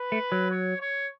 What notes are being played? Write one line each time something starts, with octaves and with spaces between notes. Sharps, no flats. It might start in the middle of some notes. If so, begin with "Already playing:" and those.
Already playing: B4
A3
F#3
C#5
C#5